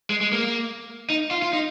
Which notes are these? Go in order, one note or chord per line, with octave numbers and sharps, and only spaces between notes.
G#3
G#3
A#3
D#4
F4
F4
D#4